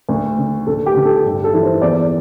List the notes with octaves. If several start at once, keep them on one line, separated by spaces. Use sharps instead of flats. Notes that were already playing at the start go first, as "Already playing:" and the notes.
D2
D3
D2 A4
G4
D3
A4
G2
A4
E3
C5
E2 D5